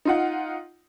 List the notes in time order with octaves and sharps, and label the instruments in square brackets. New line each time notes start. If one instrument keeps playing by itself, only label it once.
[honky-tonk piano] D#4 F4 F#5